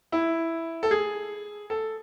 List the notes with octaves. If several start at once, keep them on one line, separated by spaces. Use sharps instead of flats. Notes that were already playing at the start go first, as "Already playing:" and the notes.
E4
A4
G#4
A4